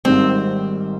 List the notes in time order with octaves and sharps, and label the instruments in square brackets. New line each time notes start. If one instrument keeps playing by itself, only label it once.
[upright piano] G#1 G#2 D#3 G3 [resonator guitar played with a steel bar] C4